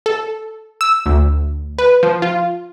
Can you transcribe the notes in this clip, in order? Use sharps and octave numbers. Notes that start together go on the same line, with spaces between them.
A4
E6
D2
B4
F3
F4